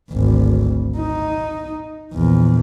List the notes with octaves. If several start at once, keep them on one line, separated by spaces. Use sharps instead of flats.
G#1 D2
D#4
A#1 E2